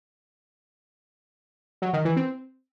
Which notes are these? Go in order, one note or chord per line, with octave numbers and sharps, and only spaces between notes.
F#3
D#3
E3
C4